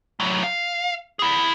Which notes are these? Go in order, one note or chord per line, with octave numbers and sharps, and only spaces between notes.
A2 F#3
F5
E4 G#4